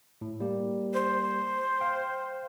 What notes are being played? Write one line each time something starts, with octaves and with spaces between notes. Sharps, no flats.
A2
G3 A#3 G4
C5
F5 G5